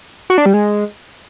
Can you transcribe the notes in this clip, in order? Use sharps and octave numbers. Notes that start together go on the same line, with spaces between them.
F#4
D4
G3
G#3